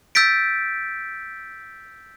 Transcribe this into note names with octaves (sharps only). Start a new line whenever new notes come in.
E6 G6 A6 B6 D7